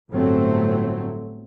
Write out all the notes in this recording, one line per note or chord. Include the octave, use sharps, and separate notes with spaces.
G1 A2 F#3 A3 C4